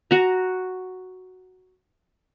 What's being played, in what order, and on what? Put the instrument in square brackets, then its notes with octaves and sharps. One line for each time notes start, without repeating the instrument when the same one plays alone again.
[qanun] F#4 A#5